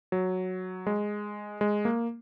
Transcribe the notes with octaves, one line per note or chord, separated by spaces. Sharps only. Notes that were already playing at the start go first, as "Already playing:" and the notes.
F#3
G#3
G#3
A#3